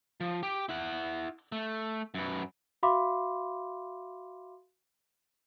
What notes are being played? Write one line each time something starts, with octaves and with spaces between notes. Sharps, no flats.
F3
G4
E4 F#5
A3
F#2 B4
F#4 E5 F5 B5 C6 D6